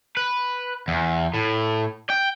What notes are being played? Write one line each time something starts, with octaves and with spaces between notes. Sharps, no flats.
B4
E2
A2
G5